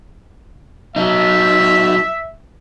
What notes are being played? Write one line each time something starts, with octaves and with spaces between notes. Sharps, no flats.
F#3 D#4 E5